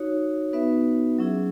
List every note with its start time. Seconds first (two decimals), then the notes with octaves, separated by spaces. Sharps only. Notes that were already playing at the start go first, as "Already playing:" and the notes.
Already playing: D#4 F#4 C#5
0.53 B3 D#4 F#4 B4 E5
1.18 F#3 C#4 E4 G#4